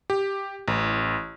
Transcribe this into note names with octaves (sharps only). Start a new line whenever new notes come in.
G4
A1